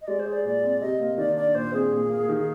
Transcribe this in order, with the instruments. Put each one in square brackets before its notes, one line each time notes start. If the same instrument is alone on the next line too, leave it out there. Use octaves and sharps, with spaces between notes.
[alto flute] D#5
[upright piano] G#3 [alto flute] D5
[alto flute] C5
[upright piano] G#4
[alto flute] D5
[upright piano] A#2 [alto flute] D5
[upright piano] C4
[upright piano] C3 [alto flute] D#5
[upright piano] A#3
[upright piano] D#3 [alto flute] D5
[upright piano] D4 [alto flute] D5
[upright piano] A#2 [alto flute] C5
[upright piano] C4 [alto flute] G#4
[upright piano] A#2
A#3
D#3